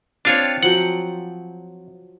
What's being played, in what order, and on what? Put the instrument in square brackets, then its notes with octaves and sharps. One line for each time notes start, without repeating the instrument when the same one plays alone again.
[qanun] C4 F5 A5 [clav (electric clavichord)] D4 F4 C#5
[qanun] F3 F#3 G5 [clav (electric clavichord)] F#5